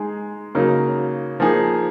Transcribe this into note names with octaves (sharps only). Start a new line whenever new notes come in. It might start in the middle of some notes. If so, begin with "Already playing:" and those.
Already playing: G#3 D#4 G#4
C#3 F#3 A#3 D#4
F3 A#3 D#4 G#4